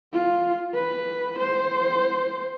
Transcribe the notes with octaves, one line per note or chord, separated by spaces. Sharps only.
F4
B4
C5